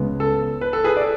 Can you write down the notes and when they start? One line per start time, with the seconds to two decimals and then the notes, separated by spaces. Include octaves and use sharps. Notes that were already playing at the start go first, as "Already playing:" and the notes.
Already playing: C#2 C#3 G#3 B3
0.20 A4
0.61 B4
0.73 A4
0.84 G#4 B4
0.97 D5
1.02 A4